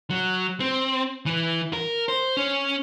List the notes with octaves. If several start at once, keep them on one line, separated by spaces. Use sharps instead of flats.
F#3
C4
E3
A#4
C5
C#4